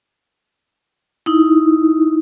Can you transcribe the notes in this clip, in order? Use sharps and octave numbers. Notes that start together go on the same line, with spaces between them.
D#4 E4